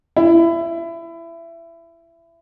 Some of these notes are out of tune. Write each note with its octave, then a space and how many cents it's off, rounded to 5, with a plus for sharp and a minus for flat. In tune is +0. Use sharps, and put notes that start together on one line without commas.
E4 +20